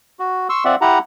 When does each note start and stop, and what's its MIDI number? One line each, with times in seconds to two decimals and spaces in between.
0.19 0.48 66
0.49 0.64 84
0.49 0.64 85
0.49 0.64 88
0.65 0.75 60
0.65 0.75 65
0.65 0.75 74
0.65 0.75 76
0.65 0.75 78
0.81 0.99 64
0.81 0.99 67
0.81 0.99 78
0.81 0.99 82